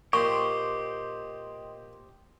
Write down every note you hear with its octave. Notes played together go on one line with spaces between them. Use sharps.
A#2 G4 C5 D#5 C6 C#6 D#6